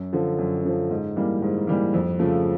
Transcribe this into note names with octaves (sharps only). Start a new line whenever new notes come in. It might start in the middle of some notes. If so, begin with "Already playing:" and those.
Already playing: F#2
D3 F3
F#2
D3 F3
G#2
E3 G3 A#3
G#2
E3 G3 A#3
F2
C#3 F3 A3